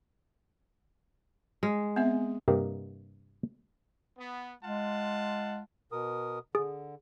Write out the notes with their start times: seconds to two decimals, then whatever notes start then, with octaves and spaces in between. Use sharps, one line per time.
1.63 G#3
1.96 B3 C4 E5
2.48 G2 C3 A#3 A#4 D#5 G5
4.18 B3
4.63 G#3 F4 F#5 A5
5.92 B2 A#4 D#6
6.55 D3 G#4